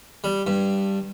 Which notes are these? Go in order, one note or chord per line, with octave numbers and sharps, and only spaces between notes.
G3
G2